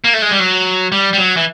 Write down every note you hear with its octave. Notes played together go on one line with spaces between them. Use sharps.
A#3
A3
G#3
G3
F#3
G3
G3
F#3
E3